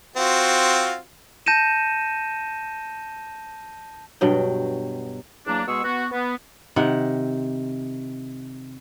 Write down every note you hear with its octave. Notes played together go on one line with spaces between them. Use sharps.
C4 F4 F#4
A5 G6 A#6 C#7 D#7 E7
G2 B2 F#3 G5
E2 F#3 A#3 D4
B2 G#3 B3 G#4 C#6 E6
B3 F#4
B3
C3 D#3 F#5